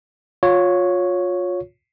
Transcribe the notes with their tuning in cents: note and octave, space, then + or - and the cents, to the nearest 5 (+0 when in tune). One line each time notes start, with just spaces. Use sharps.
F4 +30 C#5 +0